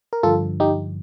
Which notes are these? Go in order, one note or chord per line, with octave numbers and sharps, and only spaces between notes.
A#4
G2 D3 F3 F4 A4
D#4 G4